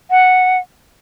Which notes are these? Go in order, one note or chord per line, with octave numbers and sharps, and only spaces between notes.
F#5